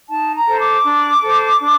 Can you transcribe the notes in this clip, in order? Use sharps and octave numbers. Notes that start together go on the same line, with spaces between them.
D#4 A5
A#5
A4 C5
D6
D4
A4 C5
D4